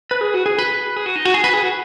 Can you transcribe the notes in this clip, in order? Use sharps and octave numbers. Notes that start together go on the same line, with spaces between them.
B4
G#4
F#4
G#4
B4
G#4
F#4
D#4
F#4
G#4
B4
G#4
F#4